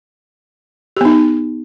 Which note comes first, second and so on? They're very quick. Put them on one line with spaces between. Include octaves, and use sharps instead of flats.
G4 B3 D#4